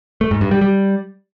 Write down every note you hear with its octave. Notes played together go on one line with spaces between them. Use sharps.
A3
G#2
G2
G3
G3